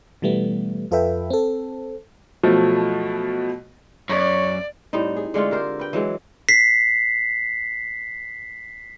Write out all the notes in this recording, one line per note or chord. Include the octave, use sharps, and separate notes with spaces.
B2 E3 G3 A3 B3
F2 F4 A4 B4 E5 G5
C4 A4
B2 F3 F#3 A3
F#2 C#5 D5
A2 G3 C4 D#4
G#4
D3 G#3 A3 F4
G4 A#4 C5
B4 G5
E3 F#3 G#3
B6 C7